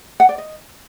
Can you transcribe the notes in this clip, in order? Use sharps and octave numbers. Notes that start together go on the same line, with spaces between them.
F#5
D5
D#5